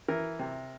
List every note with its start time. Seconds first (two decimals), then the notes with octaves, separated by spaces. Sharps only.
0.08 E3 A#4
0.39 C3